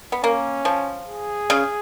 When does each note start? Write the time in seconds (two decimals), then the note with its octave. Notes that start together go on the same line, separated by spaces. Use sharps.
0.12 B3
0.24 A#3 C#4
0.65 F3
1.08 G#4
1.50 C#3